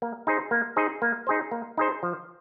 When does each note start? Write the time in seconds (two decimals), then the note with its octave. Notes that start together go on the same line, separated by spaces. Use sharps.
0.02 A#3
0.27 D#4 G#4 C5
0.51 A#3
0.76 D#4 G#4 C5
1.02 A#3
1.27 D#4 G#4 C5
1.51 A#3
1.77 D#4 G#4 C5
2.03 F3